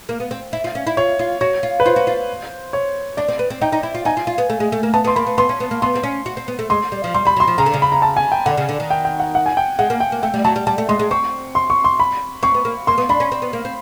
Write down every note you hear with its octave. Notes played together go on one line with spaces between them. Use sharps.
A#3
B3
C4
E4
F4
C#4
E4
F4 C#5
F4
F#4 C#5
F4
B4
F4 C5
F#4
F4
C#5
D4 D5
C4
B3
C4
D#4 G5
D#4
E4
F4
D#4 G#5
F4
F4
B3
A3
G#3
A3
A#3
B3 A5
B3
C6
A#3 B5
B3
B3 C6
C#4
B3
A#3
B3 C6
C4
C#4
F#4
C4
B3
A3
G#3 C6
G3
F3
G3 C6
G3 B5
F#3
C6
F3
C#3 A#5
D3
C#3
B5
A#5
A5
G#5
G5
D3 F#5
C#3
D3
D#3
G5
G5
F#5
F#5
G#5
G5
G#3 F#5
A#3
G5
A#3
A3 G5
G3
F#3 A5
G3
G3 A5
A3
G#3 C6
G#3
C4 C#6
C6
C#6
C6
B5
C4 C#6
B3
A#3
A#3 C6
B3
D4 B5
C#4
C4
B3
A#3
C4